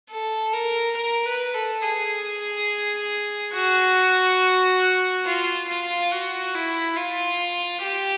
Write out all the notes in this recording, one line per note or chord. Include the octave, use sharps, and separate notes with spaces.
A4
A#4
A#4
B4
A4
G#4
F#4
F4
F4
F#4
E4
F4
G4